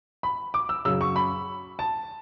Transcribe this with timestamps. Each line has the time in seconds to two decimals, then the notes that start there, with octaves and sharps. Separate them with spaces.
0.23 B5
0.54 D6
0.69 E6
0.85 F#2 C#3 F#3 E6
1.01 C#6
1.16 B5
1.79 A5